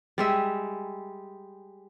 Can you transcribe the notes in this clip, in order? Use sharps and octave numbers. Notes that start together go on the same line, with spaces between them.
G3 G#3 E5